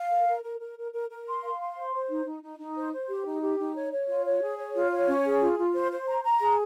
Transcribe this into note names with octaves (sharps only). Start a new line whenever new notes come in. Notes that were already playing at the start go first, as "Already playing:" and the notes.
Already playing: F5
A#4
A#4
A#4
A#4
A#4
A#4
A#4
C6
F5
C6
C5
C5
D#4
D#4
D#4
D#4
C5
C5
G4
D#4
G4
D#4
C#5
C#5
F4
C#5
G#4
C#5
F4
C#5
C#4
G#4
F4
F4
C5
C5
A#5
A#5
G#4